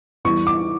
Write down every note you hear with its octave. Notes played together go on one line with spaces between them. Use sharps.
E2 E3 G3 C#6
D6